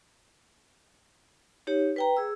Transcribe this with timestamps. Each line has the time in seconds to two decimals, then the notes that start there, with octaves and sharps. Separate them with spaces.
1.67 D#4 G4 C#5
1.96 B4 G5 A#5
2.17 G#4 E6